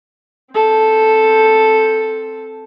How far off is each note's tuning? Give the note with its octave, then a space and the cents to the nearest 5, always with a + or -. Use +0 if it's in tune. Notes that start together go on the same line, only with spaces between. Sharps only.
C4 +0 A4 +0